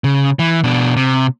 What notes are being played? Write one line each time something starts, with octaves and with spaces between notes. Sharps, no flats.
C#3
E3
B2 D4
C3